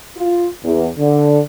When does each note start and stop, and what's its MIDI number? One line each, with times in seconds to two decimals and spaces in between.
0.17 0.48 65
0.64 0.88 40
0.98 1.40 50